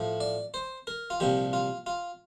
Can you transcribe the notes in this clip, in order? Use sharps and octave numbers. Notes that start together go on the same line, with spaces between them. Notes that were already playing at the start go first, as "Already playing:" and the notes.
Already playing: A2 F3
D5
C5
A#4
F4
C2 A#2 F3 G4
F4
F4